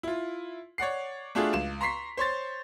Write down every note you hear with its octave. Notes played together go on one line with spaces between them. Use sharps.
E4 F4
C#5 D5 F#5 C7
A3 D4 F4 F#4 G#4
C#2 E7
A#5 C6 C#6 B6 C7
C5 C#5 C6 A6